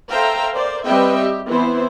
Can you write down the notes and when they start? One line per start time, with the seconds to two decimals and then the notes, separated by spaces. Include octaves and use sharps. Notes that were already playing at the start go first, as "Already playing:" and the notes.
0.11 A4 C5 E5 F5 G5 A#5
0.55 A#4 C5 D5
0.83 G3 C4 B4 D#5 E5 G5
1.19 G4
1.49 E3 B3 C4 E4 C5